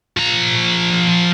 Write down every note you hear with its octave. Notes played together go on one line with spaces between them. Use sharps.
F3 A#5